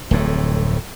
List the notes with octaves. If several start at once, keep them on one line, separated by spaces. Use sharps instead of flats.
D1 F2 A2